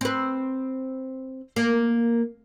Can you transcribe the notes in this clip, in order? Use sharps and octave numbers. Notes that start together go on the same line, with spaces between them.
C4 B4
A#3